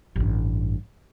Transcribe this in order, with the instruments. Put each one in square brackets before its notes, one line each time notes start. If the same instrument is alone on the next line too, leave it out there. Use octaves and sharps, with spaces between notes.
[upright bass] A1 G2